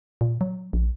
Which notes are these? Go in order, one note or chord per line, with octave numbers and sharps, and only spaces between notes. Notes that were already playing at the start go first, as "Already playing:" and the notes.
A#2
F#3
A#1